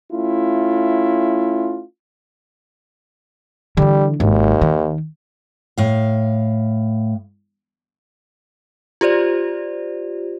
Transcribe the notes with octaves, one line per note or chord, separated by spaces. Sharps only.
A3 C#4 E4 F4
D3 E3 G3
G#1 D#2
D#3
A2 F5
F4 G4 C5 D5